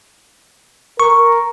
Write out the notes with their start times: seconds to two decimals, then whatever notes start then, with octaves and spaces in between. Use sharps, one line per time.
1.00 A#4 C#6